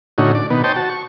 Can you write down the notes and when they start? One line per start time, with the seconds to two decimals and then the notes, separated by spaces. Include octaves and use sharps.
0.18 A2 D3 C#4 D#4 F#4
0.35 D5
0.50 B2 D#3 B3
0.64 C5 C#5 D#5 G5 A5
0.76 F#4 A5
0.90 C#6